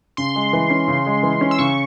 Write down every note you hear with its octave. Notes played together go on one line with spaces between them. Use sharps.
C#3 C6
G#3
E3
C#4
C#3
G#3
E3
C#4
E6
C#3 C#6